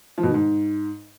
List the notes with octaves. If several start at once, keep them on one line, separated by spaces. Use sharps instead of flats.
F3
B2
D#3
G#2